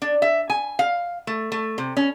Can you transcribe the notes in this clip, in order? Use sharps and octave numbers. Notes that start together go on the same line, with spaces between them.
D4
E5
G#5
F5
A3
A3
C3
C#4